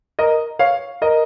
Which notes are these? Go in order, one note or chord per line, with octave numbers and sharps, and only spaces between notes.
A#4 D#5
C#5 F5
A#4 D#5